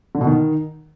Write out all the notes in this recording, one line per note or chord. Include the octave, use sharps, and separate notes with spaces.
D3
B2
D#3